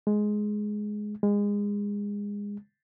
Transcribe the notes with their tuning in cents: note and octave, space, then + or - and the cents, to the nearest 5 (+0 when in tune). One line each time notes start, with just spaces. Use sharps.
G#3 +10
G#3 -25